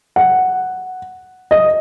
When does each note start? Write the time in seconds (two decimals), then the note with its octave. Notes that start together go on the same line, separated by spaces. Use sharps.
0.16 F#5
1.51 D#5